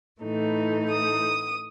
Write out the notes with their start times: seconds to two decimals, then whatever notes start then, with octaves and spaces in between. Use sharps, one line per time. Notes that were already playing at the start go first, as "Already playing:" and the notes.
0.21 A2 E3 A3 D#4
0.89 D#6